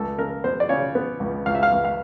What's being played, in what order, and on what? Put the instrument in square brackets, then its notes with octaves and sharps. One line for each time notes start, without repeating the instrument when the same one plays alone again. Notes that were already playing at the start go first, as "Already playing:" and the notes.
Already playing: [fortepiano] C#2 A4
C#3 A#4
B3 C5
D5
C#3 C#5
B3
C#2
C#2 F5
E5
F5
C#2
F5